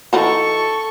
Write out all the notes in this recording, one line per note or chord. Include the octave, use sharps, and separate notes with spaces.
E3 D#4 F#4 A4 C#6